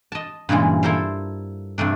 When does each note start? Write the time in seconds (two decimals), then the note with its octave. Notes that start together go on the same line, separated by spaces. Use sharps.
0.12 D#5 A5
0.49 G2 A#2 C#3 E3 G#3
0.83 E4 A4 A#4 C5 E5 F5
1.78 G2 C3 A3 D4